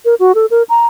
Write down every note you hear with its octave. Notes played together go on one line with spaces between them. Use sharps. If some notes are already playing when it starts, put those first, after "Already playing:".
A#4
F#4
A4
A#4
A#5